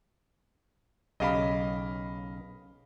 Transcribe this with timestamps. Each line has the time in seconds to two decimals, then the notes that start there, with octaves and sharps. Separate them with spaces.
1.20 B1 C#3 G4 D#5 F5 B5